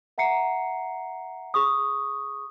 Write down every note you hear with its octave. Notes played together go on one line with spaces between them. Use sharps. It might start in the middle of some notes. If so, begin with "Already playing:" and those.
E5 F#5 A#5 C7 C#7
G#4 C#6 D#6